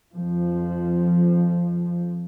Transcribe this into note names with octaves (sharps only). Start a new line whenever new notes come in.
F2 F3